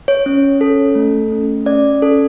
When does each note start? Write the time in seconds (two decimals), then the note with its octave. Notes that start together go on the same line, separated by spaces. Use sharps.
0.08 C#5
0.26 C#4
0.61 A4
0.95 A3
1.32 C#4
1.66 C#4 D5
2.02 C#4 A4